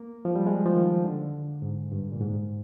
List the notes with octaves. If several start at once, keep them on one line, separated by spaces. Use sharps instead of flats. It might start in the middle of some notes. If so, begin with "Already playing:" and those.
Already playing: A#3
F3
G3
G#3
F3
D#3
D3
G#2
G2
A#2
G#2